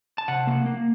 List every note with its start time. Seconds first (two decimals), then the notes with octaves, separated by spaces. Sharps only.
0.18 A5
0.28 C3 F#5
0.47 A#3
0.66 A#3